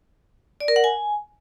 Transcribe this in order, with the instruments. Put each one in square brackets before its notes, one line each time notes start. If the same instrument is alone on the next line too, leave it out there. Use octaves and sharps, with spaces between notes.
[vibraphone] D5
A#4
F#5
G#5